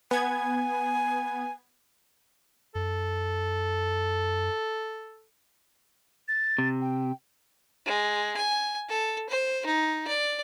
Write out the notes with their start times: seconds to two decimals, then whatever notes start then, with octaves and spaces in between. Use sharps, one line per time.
0.11 B3 G#5 G#6
2.75 F#2 A4
6.28 A6
6.58 C3
6.81 G5
7.86 G#3
8.37 G#5
8.89 A4
9.29 C5
9.66 D#4
10.08 D5